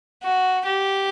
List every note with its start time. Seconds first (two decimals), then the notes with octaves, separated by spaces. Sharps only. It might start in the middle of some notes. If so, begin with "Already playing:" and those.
0.23 F#4
0.65 G4